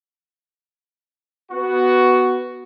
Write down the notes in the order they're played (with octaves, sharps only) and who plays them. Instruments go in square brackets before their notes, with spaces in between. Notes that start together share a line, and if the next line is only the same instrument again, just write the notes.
[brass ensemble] B3 F#4